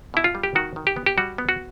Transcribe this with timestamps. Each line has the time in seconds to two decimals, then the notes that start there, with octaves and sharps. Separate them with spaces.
0.14 B2 E4
0.24 F4
0.35 G3
0.44 G4
0.55 D#3 F#4
0.76 D#3
0.87 G4
0.96 B3
1.06 G4
1.18 G3 F#4
1.38 B3
1.49 F#4